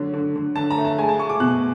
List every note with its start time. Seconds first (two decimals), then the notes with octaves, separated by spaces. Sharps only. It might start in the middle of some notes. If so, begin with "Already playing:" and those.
Already playing: D3 F#3
0.14 D3
0.36 D3
0.56 D3 A5
0.71 A#5
0.78 A3
0.85 A5
0.98 G#3 G#5
1.09 A5
1.19 G#3 C#6
1.29 D6
1.40 B2 F#6